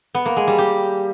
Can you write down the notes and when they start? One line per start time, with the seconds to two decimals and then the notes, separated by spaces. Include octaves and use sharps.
0.15 B3
0.26 A#3
0.37 G#3
0.48 G3
0.59 G4